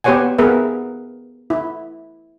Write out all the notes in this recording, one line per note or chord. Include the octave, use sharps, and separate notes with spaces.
B3 G4 C5 C#5 F#5 G#5
B3 G#4 A#4 B4 E5
E4